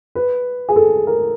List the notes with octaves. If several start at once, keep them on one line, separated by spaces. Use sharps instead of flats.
B4
G#4
A4
A#4